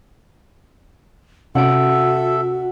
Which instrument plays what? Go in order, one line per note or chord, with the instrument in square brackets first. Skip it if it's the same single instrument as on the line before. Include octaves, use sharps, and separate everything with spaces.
[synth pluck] C3 C#4 D7 [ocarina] F#4 [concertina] A4 E5 [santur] F#5